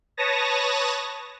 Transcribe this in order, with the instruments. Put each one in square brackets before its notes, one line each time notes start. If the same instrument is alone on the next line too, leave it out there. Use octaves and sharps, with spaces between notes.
[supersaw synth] B4 C#5 A5 D#6 A#6